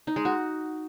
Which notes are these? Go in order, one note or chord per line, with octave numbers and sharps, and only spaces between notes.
D#4
G#3
F#4